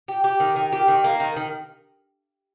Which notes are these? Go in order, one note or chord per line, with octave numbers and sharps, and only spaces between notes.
G4
G4
D#3
D#3
G4
D#3
A#3
D#3
D#3